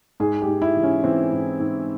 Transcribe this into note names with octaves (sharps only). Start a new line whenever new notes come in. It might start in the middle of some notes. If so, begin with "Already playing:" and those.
G#2 G#4
G4
G#2
E4
E3
C#4
E3 C4
G#2
G#2